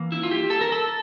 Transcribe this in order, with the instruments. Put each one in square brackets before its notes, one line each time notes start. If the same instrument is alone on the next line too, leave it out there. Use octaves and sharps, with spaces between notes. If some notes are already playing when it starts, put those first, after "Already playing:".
Already playing: [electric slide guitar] E3 A#3
E4
F4
G4
A4
A#4
A4